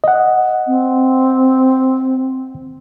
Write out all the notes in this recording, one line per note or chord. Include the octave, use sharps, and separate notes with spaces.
D#5 F#5
C4